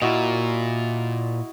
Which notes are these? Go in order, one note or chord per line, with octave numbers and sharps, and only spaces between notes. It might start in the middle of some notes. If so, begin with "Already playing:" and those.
A#2 E4 F#4 D#5